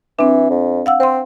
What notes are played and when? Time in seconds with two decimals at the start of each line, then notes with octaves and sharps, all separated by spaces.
0.19 E3 C4 D4
0.50 F2
0.86 F5 F#5 E6
1.00 C4 C5 C6